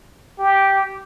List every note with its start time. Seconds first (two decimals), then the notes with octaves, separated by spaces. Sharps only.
0.39 G4